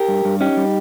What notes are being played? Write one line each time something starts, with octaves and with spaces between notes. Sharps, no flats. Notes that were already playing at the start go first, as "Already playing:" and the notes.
Already playing: G4 A#4
G2
G2
C#4 D#4 G4
G3